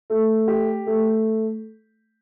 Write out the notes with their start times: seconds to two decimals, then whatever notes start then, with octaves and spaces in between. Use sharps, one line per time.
0.10 A3
0.48 G4
0.87 A3